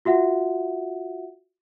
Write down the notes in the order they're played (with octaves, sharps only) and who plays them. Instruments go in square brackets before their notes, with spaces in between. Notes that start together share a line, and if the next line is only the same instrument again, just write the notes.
[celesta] F4 F#4 E5 F#5